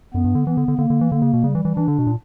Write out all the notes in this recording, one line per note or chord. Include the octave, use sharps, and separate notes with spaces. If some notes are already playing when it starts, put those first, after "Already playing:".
F#2 B3
G2
D3
E3 B3
D3
D3
D3 A#3
D3
E3
D3 A#3
C#3
B2
C#3 G3
E3
E3
E3 D4
D3
B2
A#2